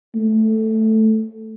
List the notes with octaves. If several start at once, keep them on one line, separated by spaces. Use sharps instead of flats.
A3